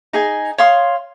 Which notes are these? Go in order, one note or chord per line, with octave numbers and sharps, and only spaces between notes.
D#4 G#4 D#5 G#5
C#5 F5 C6 D#6